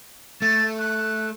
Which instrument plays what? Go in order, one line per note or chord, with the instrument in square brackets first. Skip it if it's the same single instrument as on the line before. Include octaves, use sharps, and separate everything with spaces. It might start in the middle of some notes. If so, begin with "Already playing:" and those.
[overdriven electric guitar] A3 [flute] A6
[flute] F#6